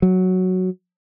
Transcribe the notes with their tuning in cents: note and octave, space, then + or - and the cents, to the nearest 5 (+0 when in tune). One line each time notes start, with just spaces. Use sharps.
F#3 +0